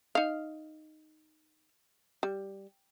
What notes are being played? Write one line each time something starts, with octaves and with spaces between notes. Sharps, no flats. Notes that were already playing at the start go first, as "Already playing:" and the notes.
D#4 F5
G3